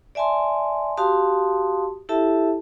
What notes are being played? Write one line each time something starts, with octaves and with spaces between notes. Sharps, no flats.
D5 E5 G#5 A5 C6
F#4 G4 F5 A5 C6 D#6
E4 G4 A4 E5 A5